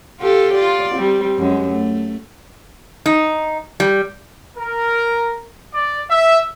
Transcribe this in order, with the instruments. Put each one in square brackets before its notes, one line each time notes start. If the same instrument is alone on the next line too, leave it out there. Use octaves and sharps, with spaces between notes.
[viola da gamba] F4 G4 A4
F4 D5
G3 C4
F#2 G#3
A3
[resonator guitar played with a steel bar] D#4
G3
[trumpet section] A#4
D5
E5